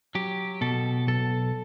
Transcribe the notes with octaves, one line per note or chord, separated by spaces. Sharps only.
F#3 G4
B2 A4
B1 A4